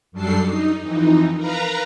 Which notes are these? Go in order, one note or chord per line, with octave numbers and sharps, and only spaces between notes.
F#2 F#3 G3 D4 A4 C7
D#4
F2 E3 D#4
A#4 B4 F5 A#5